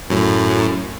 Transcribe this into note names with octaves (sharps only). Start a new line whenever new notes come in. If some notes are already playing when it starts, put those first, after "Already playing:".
F#2 A2